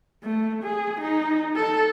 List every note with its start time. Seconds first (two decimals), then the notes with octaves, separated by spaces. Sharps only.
0.23 A3
0.63 G#4
1.01 D#4
1.56 A4